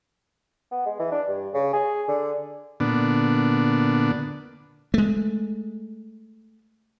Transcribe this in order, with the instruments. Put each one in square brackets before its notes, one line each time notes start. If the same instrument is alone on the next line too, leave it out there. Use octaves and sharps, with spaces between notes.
[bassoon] B3
G#3
E3
D4
G2
C#3
G#4
D3
[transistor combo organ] A#2 D3 B3 D4
[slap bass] G#3 A3